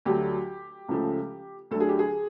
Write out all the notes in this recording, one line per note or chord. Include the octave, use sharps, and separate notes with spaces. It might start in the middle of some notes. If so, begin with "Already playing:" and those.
D2 D3 F#3 A3 G4
C#2 C#3 F3 A3
D2 D3 F#3 A3 A4
G#4
G4
G#4